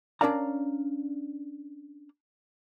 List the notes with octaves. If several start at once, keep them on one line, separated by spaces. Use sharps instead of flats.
C#4 D4 A#4 D5 F5 A#5